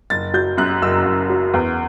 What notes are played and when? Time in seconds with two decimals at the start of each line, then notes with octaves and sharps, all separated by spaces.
0.10 F#1 A6
0.34 F#3 G6
0.57 F#2 F#6
0.82 F#1 E6
1.05 F#1
1.30 F#3
1.54 E2